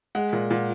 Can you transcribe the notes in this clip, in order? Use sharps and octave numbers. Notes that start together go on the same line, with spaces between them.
G#3 F#5
A#2
A#2